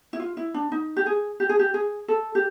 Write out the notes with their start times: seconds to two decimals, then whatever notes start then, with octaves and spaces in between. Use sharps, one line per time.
0.13 E4
0.20 F4
0.37 E4
0.54 D4
0.72 D#4
0.96 G4
1.06 G#4
1.40 G4
1.49 G#4
1.59 G4
1.74 G#4
2.08 A4
2.35 G4